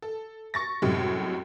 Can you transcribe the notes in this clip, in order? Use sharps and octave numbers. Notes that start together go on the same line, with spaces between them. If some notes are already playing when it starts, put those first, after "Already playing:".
A4
C#6 A6 A#6
F#2 A2 C3 G3 G#3